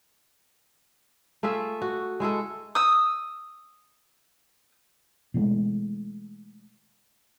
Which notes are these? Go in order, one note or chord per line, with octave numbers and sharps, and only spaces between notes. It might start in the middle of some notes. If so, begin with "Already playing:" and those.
A3 F4 G#4 E5
F#4
G#3 E4 G#4 A4
D#6 E6
B2 E3 G#3 A3